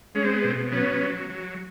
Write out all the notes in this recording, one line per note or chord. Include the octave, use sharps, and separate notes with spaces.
G#3 C#4
C4
B3
B2 C4
F#3 B3 C#4
F#3
F#3